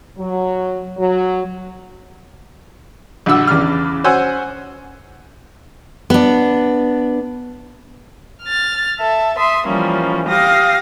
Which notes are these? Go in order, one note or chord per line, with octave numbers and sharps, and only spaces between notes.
F#3
F#3
A#1 D3 F#4 E6
E2 C#3 D4 F6
C#4 F#4 C5 F#5 G#5 E6
B3 D4
F6 A6
A4 E5
E5 C6 D#6
E3 F3 G3 A#3 C#4
G4 F5 D#6 A#6